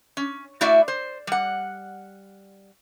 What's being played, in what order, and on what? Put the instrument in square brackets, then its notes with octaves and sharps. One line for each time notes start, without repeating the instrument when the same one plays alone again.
[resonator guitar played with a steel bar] C#4
A3 E4 F#4 D5 E5
C5
G3 F#5